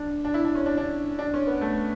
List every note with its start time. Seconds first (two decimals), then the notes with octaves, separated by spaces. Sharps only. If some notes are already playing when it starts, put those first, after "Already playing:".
Already playing: D4
0.25 D4
0.34 E4
0.45 D4
0.55 C#4
0.66 D4
0.77 D4
1.19 D4
1.34 C#4
1.47 B3
1.61 A3